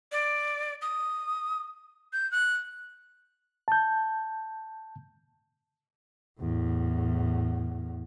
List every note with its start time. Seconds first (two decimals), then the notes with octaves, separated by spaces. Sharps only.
0.12 D5
0.82 D#6
2.13 G6
2.32 F#6
3.68 A5 G6
6.40 E2 A2